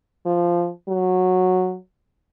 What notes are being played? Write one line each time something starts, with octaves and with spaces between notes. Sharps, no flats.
F3
F#3